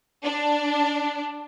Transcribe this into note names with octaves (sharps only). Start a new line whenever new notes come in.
D4